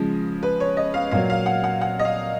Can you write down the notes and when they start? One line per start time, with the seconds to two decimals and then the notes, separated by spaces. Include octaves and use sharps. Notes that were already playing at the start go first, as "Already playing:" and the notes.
Already playing: C#3 F3 G#3
0.43 B4
0.60 C#5
0.77 D#5
0.94 F5
1.11 A#2 F#3 F5
1.30 F5
1.46 F#5
1.64 F#5
1.81 F#5
1.99 D#5
2.05 F5